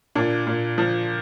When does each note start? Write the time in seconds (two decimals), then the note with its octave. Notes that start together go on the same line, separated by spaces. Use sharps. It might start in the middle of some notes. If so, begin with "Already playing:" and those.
0.15 A#2 D4
0.47 A#2
0.78 F3